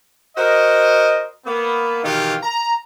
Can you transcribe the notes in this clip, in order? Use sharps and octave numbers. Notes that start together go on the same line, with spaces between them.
F#4 A#4 C5 D#5
A#3 B3
B2 D#3 E3 D#4 F4 G4
A#5